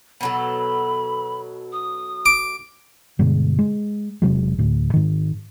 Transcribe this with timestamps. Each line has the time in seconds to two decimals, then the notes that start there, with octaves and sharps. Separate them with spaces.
0.21 B2 F#3 A4 B5
1.73 D#6
2.26 D6
3.19 G2 B2 D3 G#3
3.59 G#3
4.22 E1 C3 F#3 G#3
4.58 D2 A2
4.94 G#2 D#3